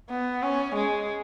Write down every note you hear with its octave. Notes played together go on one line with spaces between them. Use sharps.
B3
C#4
G#3